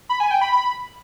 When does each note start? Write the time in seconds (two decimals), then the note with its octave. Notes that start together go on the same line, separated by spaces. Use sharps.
0.09 B5
0.20 G#5
0.31 G5
0.41 B5
0.52 B5